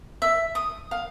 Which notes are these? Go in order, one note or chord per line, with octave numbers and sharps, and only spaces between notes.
E5
D#6
F5